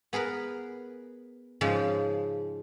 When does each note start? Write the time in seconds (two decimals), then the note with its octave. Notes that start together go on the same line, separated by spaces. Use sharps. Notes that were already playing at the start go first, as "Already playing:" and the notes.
0.13 B3 G#4 A#4 B4
1.61 G#2 C#3 F3 G#3